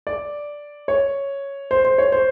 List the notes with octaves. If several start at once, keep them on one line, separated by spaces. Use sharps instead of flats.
D5
C#5
C5
C5
C#5
C5